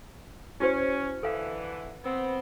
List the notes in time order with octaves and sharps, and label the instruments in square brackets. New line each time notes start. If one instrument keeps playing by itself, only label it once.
[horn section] C#4 [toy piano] E4 F#4 C5
[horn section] D3 E3 [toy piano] A4 F5
[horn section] B3 C4